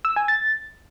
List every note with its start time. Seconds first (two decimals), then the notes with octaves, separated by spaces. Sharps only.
0.05 E6
0.16 G#5
0.28 A6